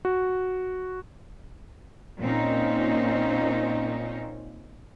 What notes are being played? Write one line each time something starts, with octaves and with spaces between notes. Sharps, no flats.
F#4
A#2 C4 C#4 D#4